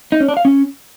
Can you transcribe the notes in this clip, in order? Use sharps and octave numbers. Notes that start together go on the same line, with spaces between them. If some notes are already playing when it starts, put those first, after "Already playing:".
D#4
C#4
D4
F5
C#4